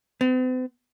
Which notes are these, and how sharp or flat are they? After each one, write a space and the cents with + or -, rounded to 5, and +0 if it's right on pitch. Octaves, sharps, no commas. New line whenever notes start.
C4 -45